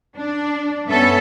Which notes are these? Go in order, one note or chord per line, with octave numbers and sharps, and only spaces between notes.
D4
G2 B3 C#4 A4 E5